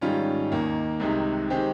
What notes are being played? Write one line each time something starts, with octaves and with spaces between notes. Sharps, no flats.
G#2 D#3 G3 C#4 F4
D#2 D#3 A#3
C2 C3 D#3 G#3 D#4
D#3 G#3 C4 G4